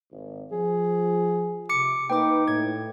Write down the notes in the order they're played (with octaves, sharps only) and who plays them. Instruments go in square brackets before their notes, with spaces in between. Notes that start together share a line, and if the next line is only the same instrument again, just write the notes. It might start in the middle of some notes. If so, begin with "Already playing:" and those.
[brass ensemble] G#1
[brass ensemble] F3 [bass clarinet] G#4
[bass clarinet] C3 [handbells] D6 C#7
[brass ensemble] A#3 B4 [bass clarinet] D#4 [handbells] G5 D6
[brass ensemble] A2 [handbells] G#6